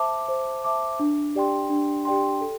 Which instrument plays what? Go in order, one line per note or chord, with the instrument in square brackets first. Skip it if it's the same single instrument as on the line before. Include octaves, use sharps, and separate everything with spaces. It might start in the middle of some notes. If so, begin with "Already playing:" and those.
Already playing: [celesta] C5 E5 A5 D6
C5
E5 A5 D6
D4
G4 D5 G5 C6
D4
G4 D5 G5 C6
A4